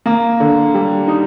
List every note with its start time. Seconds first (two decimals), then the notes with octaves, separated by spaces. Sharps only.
0.06 A#3
0.40 D3
0.74 G3
1.07 D#4